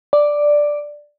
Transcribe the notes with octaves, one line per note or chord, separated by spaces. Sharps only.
D5